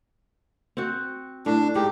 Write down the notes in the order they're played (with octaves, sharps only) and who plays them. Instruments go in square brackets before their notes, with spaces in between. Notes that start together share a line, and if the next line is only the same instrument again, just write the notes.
[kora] C4 F#4
[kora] A2 [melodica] D4
[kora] G#2 D#4 [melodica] G4